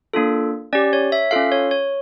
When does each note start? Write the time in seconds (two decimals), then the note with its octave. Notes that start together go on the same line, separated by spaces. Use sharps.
0.14 A#3 D4 F4 A4
0.73 C#4 G4 D5
0.93 C#5
1.12 E5
1.31 C#4 F4 A4 F5
1.52 C#5
1.71 C#5